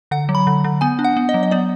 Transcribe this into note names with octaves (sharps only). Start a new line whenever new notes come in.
D3 F#5
F#3
B5
D3
D3
B3 G#5
D4
F#5
B3
D#5
F#3
D#5
B3 D5